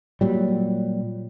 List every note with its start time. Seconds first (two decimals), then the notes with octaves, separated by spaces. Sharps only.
0.21 A#2 F#3 G3